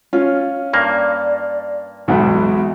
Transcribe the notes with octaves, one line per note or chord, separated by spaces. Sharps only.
C#4 F4
G2 A#3 D5
B1 E2 B2 G#3